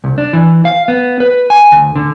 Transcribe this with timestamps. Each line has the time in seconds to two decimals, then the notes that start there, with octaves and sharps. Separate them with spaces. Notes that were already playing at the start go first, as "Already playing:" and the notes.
0.04 C2
0.18 D4
0.33 E3
0.65 F5
0.88 B3
1.20 B4
1.50 G#5
1.72 D2
1.96 D3